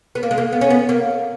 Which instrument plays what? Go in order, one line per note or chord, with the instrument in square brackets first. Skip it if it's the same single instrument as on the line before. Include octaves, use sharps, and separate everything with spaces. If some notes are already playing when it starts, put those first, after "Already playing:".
[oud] B3
A#3
G#3
A#3
B3
C#4
B3
A#3